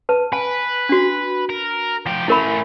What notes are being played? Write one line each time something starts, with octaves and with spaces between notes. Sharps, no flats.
B4 A5
B4 G#5
D4 F#4
A#4
F3 G4
A3 C#4 E4 A#4 B5